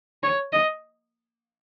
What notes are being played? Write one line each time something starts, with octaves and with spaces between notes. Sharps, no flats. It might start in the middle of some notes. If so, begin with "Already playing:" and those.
C#5
D#5